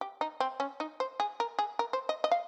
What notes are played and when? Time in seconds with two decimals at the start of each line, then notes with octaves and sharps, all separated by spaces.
0.01 G4
0.21 D#4
0.40 C4
0.60 C#4
0.80 D#4
1.00 C5
1.20 G#4
1.40 A#4
1.59 G#4
1.79 A#4
1.93 C5
2.09 D#5
2.24 D#5
2.31 F5